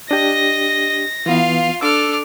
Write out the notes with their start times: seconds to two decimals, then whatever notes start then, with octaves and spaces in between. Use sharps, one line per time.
0.11 D4 G4 D#5 A#6
1.26 E3 B3 F4 F5
1.81 D4 A4 D6 E6 F6